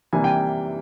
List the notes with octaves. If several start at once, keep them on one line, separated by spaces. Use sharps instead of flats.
C3 E3 G3 A#3 D4 G#5
G5